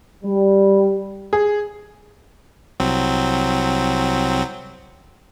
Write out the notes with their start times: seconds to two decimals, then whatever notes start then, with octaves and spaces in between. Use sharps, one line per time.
0.24 G3
1.33 G#4
2.80 C2 F#3 C4